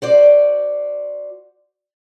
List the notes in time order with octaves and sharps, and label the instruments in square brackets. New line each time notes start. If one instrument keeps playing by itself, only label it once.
[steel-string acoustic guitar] F#4 C5 D5